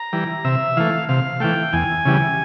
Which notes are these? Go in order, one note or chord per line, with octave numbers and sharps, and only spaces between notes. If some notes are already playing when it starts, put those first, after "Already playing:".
Already playing: A#5
E3 G3
C3 E5
E3 A3 F5
C3 F5
E3 A3 G5
E2 G#5
C#3 E3 G3